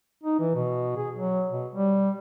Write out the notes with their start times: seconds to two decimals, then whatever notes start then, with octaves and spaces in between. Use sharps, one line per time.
0.23 D#4
0.39 E3
0.55 B2
0.97 G#4
1.16 F#3
1.52 B2
1.75 G3